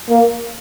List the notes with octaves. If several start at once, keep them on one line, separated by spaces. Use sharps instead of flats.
A#3